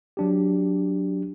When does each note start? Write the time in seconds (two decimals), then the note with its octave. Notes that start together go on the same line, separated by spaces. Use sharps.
0.17 F#3 D4 G4